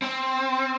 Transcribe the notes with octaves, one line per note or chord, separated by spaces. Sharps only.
C4